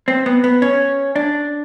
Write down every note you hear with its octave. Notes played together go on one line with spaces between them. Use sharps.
C4
B3
B3
C#4
D4